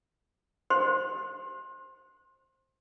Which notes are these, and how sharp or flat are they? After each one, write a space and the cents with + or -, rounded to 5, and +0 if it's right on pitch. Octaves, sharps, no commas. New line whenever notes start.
G4 -40 C5 +15 C6 +30